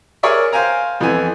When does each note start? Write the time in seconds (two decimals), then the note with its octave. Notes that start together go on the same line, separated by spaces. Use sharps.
0.23 G#4 A#4 C#5 D5 E5
0.53 C5 F5 G5 G#5 A#5
1.00 F2 E3 B3 G#5